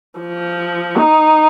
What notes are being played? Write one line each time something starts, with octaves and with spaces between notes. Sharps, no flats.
F3
D#4